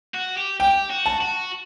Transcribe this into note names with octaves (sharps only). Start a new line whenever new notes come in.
F#4
G4
G4 G5
F#4
A5
F#4